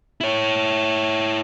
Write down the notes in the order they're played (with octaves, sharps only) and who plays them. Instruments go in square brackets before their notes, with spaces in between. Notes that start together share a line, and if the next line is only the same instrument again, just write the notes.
[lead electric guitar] E4 C#5